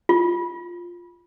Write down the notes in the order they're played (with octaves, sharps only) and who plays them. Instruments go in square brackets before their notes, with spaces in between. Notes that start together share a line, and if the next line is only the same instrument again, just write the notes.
[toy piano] F4